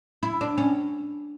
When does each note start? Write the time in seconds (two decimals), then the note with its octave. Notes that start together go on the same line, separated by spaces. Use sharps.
0.23 E4
0.41 D4
0.58 C#4